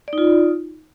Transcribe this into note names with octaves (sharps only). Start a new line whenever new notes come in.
D#4 F4 D5